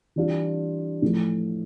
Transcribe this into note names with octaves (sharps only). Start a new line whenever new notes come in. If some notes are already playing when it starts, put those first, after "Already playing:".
E3 G3 D4 F4
A2 F3 A3